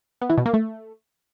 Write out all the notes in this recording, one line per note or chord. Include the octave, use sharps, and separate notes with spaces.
B3
E3
B2
A#3
A3